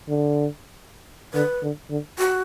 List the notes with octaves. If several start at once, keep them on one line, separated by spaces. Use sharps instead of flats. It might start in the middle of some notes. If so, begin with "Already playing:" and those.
D3
D3 B4
D3
D3
F#4